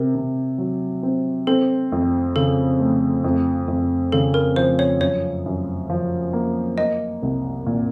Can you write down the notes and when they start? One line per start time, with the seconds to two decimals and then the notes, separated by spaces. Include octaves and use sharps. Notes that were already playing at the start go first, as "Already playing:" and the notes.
Already playing: C3 A#4
0.15 C3
0.58 F#3
1.03 C4
1.47 C4 A4
1.92 F2
2.36 C#3 A4
2.80 A3
3.24 F2
3.68 F2
4.12 C#3 A4
4.34 A#4
4.56 F3 C5
4.79 C#5
5.00 F#2 C#5
5.46 F#2
5.90 F3
6.33 A#3
6.78 A#3 D#5
7.23 C2
7.66 A#2